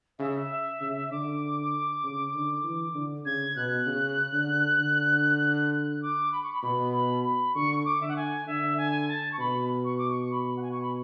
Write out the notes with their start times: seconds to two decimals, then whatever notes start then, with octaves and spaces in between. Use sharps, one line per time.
0.19 C#3 E5
0.35 E5
0.81 C#3
1.11 D3 D6
2.03 C#3
2.34 D3
2.64 E3
2.95 D3
3.25 C#3 G#6
3.56 B2 F#6
3.86 C#3
4.33 D3
4.78 D3
5.71 F#6
6.02 D6
6.32 B5
6.42 C#6
6.52 B5
6.63 B2 B5
6.93 B5
7.24 B5
7.55 D3 C#6
7.79 C#6
7.86 D6
8.01 D3 E5
8.08 F#5
8.16 G#5
8.47 D3 E5
8.77 G#5
9.09 A5
9.32 C#6
9.39 B2 B5
9.84 C#6
9.98 D6
10.10 C#6
10.31 B5
10.57 F#5
10.62 G#5
10.71 C#6
10.82 B5